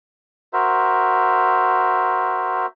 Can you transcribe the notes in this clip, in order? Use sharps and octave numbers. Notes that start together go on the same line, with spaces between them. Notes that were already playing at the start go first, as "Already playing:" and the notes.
F#4 A#4 C5 E5